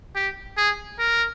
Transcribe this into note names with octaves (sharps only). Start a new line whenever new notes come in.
G4
G#4
A#4